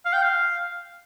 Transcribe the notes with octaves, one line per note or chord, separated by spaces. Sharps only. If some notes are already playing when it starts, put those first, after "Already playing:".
F5
G5
F5